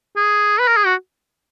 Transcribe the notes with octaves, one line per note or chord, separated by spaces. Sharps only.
G#4
B4
A#4
G#4
F#4